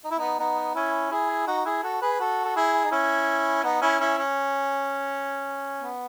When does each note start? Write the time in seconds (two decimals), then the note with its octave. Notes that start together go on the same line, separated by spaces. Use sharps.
0.04 D#4
0.11 E4
0.19 B3 D#4
0.40 B3 D#4
0.75 C#4 E4
1.11 E4 G#4
1.47 D#4 F#4
1.65 E4 G#4
1.83 F#4 A4
2.02 G#4 B4
2.20 F#4 A4
2.45 A4
2.56 E4 G#4
2.84 D#4
2.91 C#4 E4
3.64 B3 D#4
3.82 C#4 E4
4.00 C#4 E4
4.19 C#4
5.81 B3